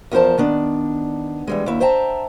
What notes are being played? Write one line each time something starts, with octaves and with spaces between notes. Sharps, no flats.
E2 F3 A#4 C5 A5
D#3 B3 D4
E3 G3 G#3
D#2 E4
C5 E5 G5 A5 A#5